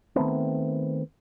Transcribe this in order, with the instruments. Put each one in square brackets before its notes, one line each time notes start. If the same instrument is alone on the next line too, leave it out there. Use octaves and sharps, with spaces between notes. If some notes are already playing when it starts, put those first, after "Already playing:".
[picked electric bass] D#3 A3 B3 C4